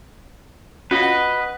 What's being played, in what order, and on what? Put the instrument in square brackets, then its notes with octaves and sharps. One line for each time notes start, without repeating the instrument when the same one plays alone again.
[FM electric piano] C#4 F4 F#4 [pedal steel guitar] B4 D#5
[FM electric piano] F#5